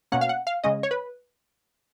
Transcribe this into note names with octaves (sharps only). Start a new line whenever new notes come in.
B2 A#3 C#4 F#5
F5
F#5
F5
C#3 G#3 C#4 D#5
C#5
B4